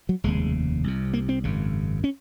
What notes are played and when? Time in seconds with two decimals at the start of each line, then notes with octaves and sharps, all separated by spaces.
0.09 F#3
0.24 F1 D#2 C#3 G#3
0.84 C2 C3
1.13 A#3
1.29 C4
1.44 G#1 F#2 C#3
2.04 C#4